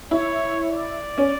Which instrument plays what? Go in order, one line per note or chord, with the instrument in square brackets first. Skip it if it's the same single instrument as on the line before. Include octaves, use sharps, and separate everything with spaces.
[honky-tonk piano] E4 [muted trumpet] C#5
[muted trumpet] D5
[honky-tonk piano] C#4